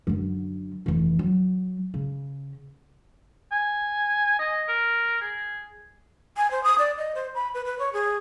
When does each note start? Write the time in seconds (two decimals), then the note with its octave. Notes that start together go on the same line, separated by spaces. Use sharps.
0.07 F#2 D3
0.86 F1 E3
1.19 F#3
1.94 C#3
3.52 G#5
4.39 D#5
4.69 A#4
5.21 G#4
6.37 G#5
6.51 C5
6.64 D#6
6.79 D5
6.97 D#5
7.15 C5
7.35 B5
7.54 B4
7.66 B4
7.79 C#5
7.93 G#4